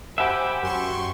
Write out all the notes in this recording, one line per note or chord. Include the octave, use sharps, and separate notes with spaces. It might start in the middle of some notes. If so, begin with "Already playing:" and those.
G4 C5 E5 F#5 G#5 B5
F#2 F#4 C6 C#6